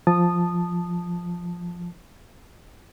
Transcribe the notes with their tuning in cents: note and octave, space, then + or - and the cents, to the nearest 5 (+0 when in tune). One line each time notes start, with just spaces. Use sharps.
F3 +0 A5 -5 D#6 -15